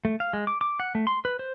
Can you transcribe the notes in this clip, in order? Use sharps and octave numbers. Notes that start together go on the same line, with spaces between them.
A3
F5
G#3
D6
D6
F#5
A3
C6
B4
C5